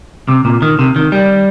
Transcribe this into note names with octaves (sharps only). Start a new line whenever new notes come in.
C3
A#2
D#3
C3
D#3
G3